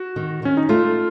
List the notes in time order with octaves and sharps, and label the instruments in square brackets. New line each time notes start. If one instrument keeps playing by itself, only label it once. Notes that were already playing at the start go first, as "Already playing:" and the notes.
Already playing: [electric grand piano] F#4
[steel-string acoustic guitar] D#3
[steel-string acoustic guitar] D#3 [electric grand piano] C#4
[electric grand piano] D#4
[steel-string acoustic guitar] A3 [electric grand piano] F4